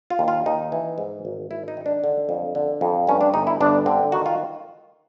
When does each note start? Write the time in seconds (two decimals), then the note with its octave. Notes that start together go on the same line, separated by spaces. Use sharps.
0.10 F4
0.19 D#2
0.28 F4
0.46 D#2 D#4
0.72 E3
0.98 G#2
1.25 G#1
1.51 G#1 E4
1.68 D#4
1.77 D#3
1.86 D4
2.04 D3
2.29 F2
2.55 D3
2.81 F2
3.07 G2 C#4
3.21 D4
3.34 G1 D#4
3.47 E4
3.60 G1 D4
3.86 D3 C4
4.12 D#3 F#4
4.26 F4